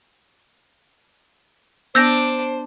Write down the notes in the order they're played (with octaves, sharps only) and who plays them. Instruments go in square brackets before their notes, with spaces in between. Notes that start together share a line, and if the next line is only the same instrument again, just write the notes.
[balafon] B3 [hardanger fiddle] D4 [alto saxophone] C5 [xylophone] E6 G6 A#6